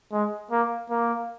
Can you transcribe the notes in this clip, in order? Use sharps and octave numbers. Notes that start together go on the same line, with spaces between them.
G#3
A#3
A#3